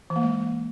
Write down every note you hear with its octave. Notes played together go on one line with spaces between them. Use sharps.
E3
A#3
G#3